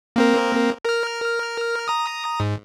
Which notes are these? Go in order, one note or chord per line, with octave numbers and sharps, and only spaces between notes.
A#3 C4 A#4
A#4 F6
A#5 D#6
G#2